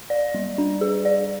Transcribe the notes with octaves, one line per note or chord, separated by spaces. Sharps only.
D5
G3
D4
G#4
D5